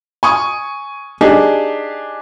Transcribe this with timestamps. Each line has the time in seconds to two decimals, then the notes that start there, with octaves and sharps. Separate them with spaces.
0.23 G#5 C#6 D#6
1.21 D4 D#4 G4 G#4